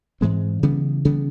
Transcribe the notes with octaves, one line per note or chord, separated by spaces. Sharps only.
G#2 E3 G#3 C4
C#3 E3 G3 B3
C#3 E3 G3 B3